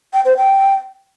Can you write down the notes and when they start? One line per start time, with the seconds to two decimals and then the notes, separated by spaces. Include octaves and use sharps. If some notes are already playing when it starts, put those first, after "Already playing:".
0.13 G5
0.25 C5
0.37 G5